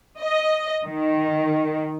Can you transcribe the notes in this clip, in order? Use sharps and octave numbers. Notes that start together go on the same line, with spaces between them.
D#5
D#3